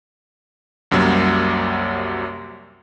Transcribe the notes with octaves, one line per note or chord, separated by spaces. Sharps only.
C2 F#2 C3 F#3 G3 A#3